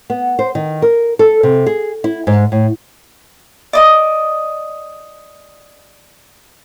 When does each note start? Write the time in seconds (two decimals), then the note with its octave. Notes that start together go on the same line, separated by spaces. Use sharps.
0.10 B3
0.39 C5
0.55 D#3
0.82 A#4
1.19 A4
1.43 C3
1.66 G#4
2.04 E4
2.27 G#2
2.52 A2
3.73 D5 D#5 D#6